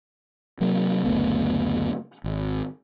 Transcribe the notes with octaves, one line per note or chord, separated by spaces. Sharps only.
C3 F#3 A#3
F#1 D2 A3 B3
G#1